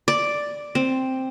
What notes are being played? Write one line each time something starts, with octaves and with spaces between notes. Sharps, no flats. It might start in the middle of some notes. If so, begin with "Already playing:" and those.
D5
C4